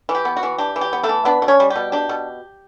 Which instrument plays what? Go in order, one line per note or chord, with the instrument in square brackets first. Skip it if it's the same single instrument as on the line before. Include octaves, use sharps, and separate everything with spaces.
[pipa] E3
G4
B3
F#4
E3
D4 G4
E3
G4
B3
A3 A4
E3
B3 D4 B4
B2
C#4 C#5
G3
G4
B2
D4 G4
B2